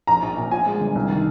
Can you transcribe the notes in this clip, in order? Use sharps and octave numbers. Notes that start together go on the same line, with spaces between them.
A#1 A#5
A#1
A#2
F3 G#5
G#3
G1
C2
D#3